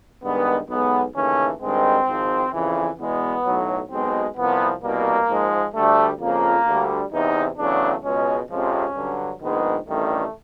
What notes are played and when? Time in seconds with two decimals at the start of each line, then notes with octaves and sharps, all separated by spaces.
0.23 G2 D#3 G#3 B3
0.69 B1 B2 G#3 B3
1.15 D#2 C#3 E3 A3 C#4
1.61 G#1 G2 D#3 G#3 C4
2.07 G#1 G#2 F3
2.53 F2 C#3 E3
2.99 E2 B2 G#3 B3
3.45 B1 A2 F#3
3.91 B1 B2 G#3 C4
4.37 C2 C3 F3 B3
4.82 C2 B2 G3 A#3
5.28 G#2 F3 G#3
5.75 D2 D3 G3 A3
6.20 F2 C#3 F3 A#3
6.66 D2 D3 G3
7.12 E2 C3 E3 D#4
7.58 E2 C#3 F#3 A3 D4
8.04 C#2 B2 G#3 C#4
8.50 F2 C3 F3 G#3 C#4
8.96 G2 D3 F#3
9.41 A#1 G#2 D#3 G#3 B3
9.88 A1 G2 D#3 G3 A3